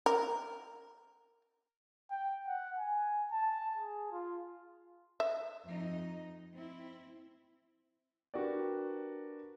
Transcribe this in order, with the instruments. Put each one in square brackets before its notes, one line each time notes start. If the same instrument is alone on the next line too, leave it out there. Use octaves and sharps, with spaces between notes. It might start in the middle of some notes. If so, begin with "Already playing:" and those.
[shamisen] A#4
[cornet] G5
F#5
G#5
A5
G#4
F4
[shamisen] E5
[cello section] F2 D#4
C4 E4
[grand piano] D4 F#4 G4 A#4 B4 D5